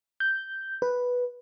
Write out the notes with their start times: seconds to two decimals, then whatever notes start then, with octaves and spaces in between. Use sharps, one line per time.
0.20 G6
0.82 B4